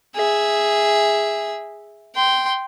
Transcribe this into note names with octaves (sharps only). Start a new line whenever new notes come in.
G#4 E5
G5 C6